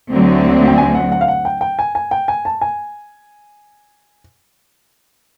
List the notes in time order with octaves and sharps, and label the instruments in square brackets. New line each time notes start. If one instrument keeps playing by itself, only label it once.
[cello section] D2 D3 F#3 A3 C4
[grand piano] G5
G#5
F#5
F#5
F5
F#5
G5
G5
G#5
G#5
G5
G#5
A5
G#5